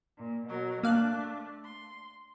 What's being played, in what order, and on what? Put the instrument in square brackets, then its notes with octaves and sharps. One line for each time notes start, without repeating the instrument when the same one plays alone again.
[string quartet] A#2
B2 F#3 A#4
[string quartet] A3 D4 [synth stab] A#3 F5 F#6
[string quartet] C6